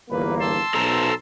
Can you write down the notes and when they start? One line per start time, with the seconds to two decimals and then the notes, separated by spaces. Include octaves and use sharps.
0.11 G1 E2 A#3 B4
0.40 A5 C6 E6
0.74 B1 A4 C5 A#5